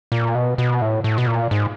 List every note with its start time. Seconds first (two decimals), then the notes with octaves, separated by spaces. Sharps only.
0.12 A#2
0.35 B2
0.58 B2
0.82 A2
1.04 A2
1.18 B2
1.27 A#2
1.51 G#2